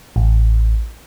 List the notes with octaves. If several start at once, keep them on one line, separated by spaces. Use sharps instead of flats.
A1